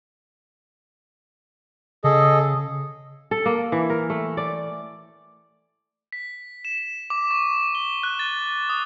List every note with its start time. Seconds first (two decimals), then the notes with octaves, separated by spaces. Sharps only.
2.04 C#3 G#4 A4 D#5
3.31 A4
3.46 A#3
3.72 E3
3.90 A#4
4.10 A3
4.37 D5
6.12 B6
6.65 E7
7.10 D6
7.31 C#6
7.75 G7
8.03 F#6
8.19 A6
8.70 D#6